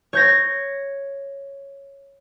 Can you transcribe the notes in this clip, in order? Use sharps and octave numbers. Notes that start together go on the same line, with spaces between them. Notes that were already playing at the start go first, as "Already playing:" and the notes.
C#5 G6 A#6